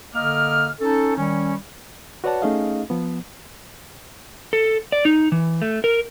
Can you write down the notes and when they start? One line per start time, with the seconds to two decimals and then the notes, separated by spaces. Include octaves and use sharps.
0.14 D3 A#3 D#5 D6 F6
0.80 C#4 D#4 A4
1.16 D#3 G3 C#4
2.24 F#4 B4 C#5 D5 F#5 A5
2.42 A3 C#4 D#4 G#4 D#5 F5
2.90 F3 B3
4.53 A4
4.92 D5
5.05 D#4
5.32 E3
5.62 A3
5.84 A#4